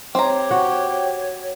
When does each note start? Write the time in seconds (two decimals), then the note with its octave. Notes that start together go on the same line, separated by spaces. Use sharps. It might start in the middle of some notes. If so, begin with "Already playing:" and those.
0.15 C4 G4 C#5 A#5
0.51 F#4 F#5